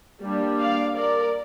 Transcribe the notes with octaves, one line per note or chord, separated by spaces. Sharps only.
G3 A#3 D4
D5 F5
A#4 D5